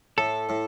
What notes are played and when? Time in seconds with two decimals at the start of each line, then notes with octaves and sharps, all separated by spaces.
0.18 A2 A4
0.49 A2